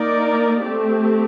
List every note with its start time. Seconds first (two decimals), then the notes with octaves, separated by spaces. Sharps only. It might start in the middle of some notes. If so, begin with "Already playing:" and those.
Already playing: A#3 D#4 A#4 D5
0.64 A3 C4 G4